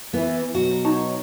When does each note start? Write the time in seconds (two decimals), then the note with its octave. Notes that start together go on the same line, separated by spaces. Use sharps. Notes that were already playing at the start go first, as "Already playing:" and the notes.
0.13 E3 B3
0.55 B2 F#3 F#4
0.84 D#4 C#5 A5